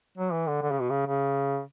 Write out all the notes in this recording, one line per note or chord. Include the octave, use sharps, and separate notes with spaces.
F#3
E3
D3
D3
C#3
B2
C#3
C#3